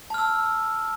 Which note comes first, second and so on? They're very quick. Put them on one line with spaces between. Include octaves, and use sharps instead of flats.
A5 F6 E6